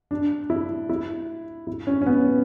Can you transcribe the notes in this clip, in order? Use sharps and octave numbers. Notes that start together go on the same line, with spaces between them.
D4
E4
E4
E4
C#4
C#4
B3